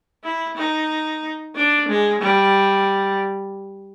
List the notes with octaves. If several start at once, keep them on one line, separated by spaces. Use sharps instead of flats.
E4
D#4
D4
G#3
G3